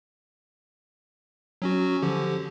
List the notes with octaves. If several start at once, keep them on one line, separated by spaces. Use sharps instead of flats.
F#3 C#4 F#4
D3 F3 G4